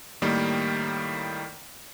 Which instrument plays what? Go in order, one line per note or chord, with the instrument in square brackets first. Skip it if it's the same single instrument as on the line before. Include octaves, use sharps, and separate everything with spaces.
[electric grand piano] A2 D#3 G3 A#3